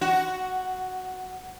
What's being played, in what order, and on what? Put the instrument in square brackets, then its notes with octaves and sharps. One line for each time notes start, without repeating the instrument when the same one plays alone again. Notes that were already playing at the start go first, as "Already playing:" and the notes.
[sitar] F#4